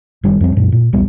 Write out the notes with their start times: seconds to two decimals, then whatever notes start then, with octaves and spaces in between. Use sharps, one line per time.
0.23 F#1 D#3 G3 D4
0.41 F2 G3 C4
0.57 F#2 A#2
0.72 A#2
0.93 E1 B1 G3 B3